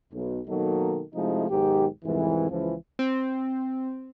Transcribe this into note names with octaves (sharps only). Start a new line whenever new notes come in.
B1
B2 D#3 F#3 A#3 D#4 A4
C3 F3 G#3 A3 D#4 E4
B1 G#2 D#3 G4
C2 F2 G#2 E3
C#2 E3 F3
C4